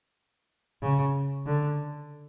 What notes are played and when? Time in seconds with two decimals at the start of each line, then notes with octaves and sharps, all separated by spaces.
0.83 C#3
1.46 D3